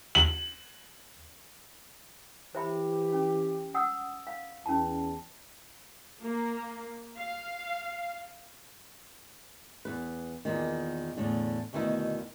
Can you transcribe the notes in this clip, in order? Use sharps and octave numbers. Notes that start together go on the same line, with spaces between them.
F#7
E3 G4 C5 E5 B5
C#4
F#5 D#6 E6
F5
E2 C#4 A5
A#3
F5
E2 B4
E2 G2 A#2 D#3
E2 A2 D3
D2 B2 D#3 D#4 E4